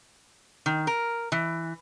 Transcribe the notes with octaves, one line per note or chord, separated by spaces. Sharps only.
D#3
A#4
E3